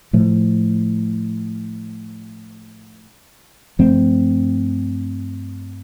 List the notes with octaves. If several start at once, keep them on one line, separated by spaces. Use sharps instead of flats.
A2 F3 A3
G2 F3 A3 C4